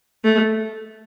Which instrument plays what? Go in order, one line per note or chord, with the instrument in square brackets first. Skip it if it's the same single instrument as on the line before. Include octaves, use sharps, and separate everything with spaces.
[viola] A3